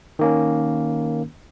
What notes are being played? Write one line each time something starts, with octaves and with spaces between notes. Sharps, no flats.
D#3 A#3 C#4